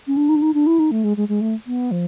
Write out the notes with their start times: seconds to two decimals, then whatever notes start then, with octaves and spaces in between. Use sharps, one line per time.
0.07 C#4
0.17 D4
0.29 D#4
0.36 D4
0.42 D#4
0.54 D4
0.66 E4
0.79 D#4
0.91 A3
1.04 G#3
1.17 G#3
1.29 G#3
1.41 A3
1.67 B3
1.91 F3